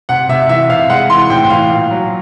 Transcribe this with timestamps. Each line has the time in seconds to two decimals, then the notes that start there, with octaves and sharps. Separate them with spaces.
0.09 C3 F#5
0.29 C3 E5
0.49 E3 E5
0.69 C3 F5
0.90 G#3 F#5
1.10 E3 C6
1.30 A2 G5
1.50 E3 F5
1.70 A#2
1.91 F#3